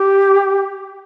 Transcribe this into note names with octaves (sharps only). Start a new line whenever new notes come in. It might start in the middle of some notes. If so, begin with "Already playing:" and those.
Already playing: G4